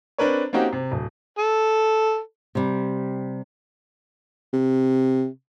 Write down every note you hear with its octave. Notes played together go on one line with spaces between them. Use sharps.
C4 D4 A#4 B4 C#5
A#3 C4 C#4 D#4 F#4 G4
C3
D1
A4
C3 G3
C3